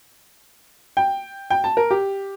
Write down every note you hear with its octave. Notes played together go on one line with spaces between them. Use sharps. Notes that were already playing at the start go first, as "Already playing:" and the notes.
G5
G5
A5
A#4
G4